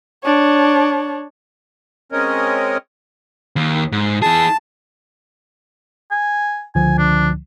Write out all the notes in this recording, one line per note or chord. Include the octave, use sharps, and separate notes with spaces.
D4 C#5
G#3 C4 C#4 A#4 C#5 D#5
D#2
G#2
E3 G#4 A5
G#5
C#2 D3 F3 G#5
D4